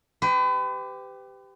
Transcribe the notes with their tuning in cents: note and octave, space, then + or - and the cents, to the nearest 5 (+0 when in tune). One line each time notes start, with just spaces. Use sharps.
G4 +0 B4 +40